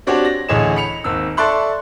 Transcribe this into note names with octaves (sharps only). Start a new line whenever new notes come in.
C4 D4 F#4 G4 C#5
A#6
A1 D2 G#4 C#5 D#5 E7
B5 C#7 F7
G#1 D#2 E6
A4 D5 E5 C6 C#6 F#6